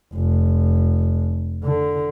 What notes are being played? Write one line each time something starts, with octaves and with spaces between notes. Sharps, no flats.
F1
D3